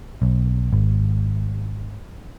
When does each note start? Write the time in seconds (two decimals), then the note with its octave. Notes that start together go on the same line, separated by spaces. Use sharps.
0.22 B1
0.73 G#1